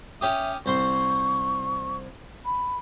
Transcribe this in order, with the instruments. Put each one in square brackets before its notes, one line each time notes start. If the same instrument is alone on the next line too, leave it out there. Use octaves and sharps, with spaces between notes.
[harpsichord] C#4 G4 D#6 [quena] E5
[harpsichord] C2 C5 C6 [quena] C#6
[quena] B5